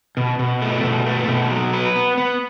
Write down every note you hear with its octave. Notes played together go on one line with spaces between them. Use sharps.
B2
B2
A3
B2
A3
B2
F#3
B4
B3
B3